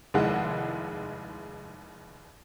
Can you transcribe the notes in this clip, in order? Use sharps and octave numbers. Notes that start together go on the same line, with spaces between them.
F1 D#2 G#3 D#4 E4 F#5